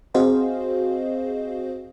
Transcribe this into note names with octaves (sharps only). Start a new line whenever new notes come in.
C4 F#4 G#4 C5 D#5 F5